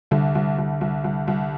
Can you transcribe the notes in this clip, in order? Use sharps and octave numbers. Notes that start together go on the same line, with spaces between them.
C2 D3
C2
C2
C2
C2
C2